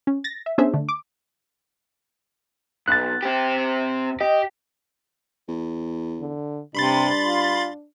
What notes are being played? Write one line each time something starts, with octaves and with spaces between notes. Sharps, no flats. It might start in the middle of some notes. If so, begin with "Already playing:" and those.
C#4
A6 A#6
E5
B3 C#4 D4 G#4 C5 E5
D3 A3
D6
B1 F#6 A6
C4 G4
G4 D#5
E2
D3
G2 C3 D4 B5 C6 A6
F4